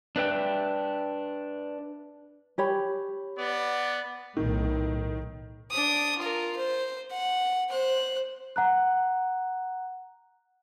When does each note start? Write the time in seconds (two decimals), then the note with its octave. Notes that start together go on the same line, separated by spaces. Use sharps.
0.16 D4 B4 E5 G5
2.58 G4 C#5 B5
3.37 B3 D5
4.37 B1 A2 D#3
5.71 D4 D#6
6.18 F4 A#4
6.56 C5
7.11 F#5
7.69 C5 F#6
8.56 F#5 A#5 F#6